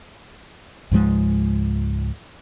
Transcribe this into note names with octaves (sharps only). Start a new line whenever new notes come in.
C#2 G#2 F3 G#3